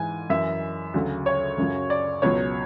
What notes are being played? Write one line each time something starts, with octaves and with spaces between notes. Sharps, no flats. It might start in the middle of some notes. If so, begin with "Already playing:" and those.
Already playing: G#2 E3 G#5
F#2 E3 E5
D2 C#3 F#3
C#5
F#2 C#3 F#3
D5
C#2 B2 F#3 C#5